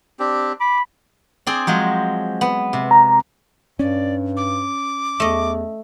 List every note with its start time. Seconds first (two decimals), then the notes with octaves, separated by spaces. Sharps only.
0.19 C4 D4 G4
0.60 B5 D6
1.47 C4 G#4 D5
1.67 F3 F#3 G#3
2.41 B3
2.73 C3
2.91 A#5
3.79 G2 C#4 D5
4.37 D6
5.20 E2 A3 D#5